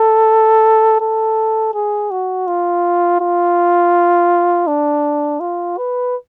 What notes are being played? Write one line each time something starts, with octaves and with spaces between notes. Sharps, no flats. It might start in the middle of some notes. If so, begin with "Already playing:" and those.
Already playing: A4
A4
G#4
F#4
F4
F4
D4
F4
B4